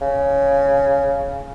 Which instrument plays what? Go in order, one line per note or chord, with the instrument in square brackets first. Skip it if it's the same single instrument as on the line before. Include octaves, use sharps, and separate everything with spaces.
[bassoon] C#3